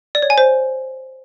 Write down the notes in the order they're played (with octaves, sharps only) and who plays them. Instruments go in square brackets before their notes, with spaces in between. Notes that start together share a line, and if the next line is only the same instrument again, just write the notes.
[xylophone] D5
C#5
G#5
C5